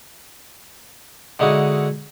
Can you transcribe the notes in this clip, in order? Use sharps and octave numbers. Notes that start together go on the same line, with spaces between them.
D3 G#3 D#4 E4 F#4